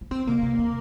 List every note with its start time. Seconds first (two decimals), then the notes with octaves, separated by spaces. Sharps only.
0.01 F3
0.11 D#3 C4
0.27 C3 A#3
0.38 D#3
0.43 C3
0.59 D#3